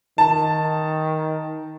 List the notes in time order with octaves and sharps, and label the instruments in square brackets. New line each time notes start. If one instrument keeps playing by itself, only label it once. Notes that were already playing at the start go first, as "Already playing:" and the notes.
[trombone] D#3 [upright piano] A5